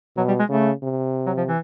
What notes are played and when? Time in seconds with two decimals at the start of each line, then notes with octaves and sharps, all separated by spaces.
0.17 B2 F#3
0.28 G3
0.39 G#3
0.50 C#3 A3
0.83 C3
1.26 F#3
1.37 F3
1.48 E3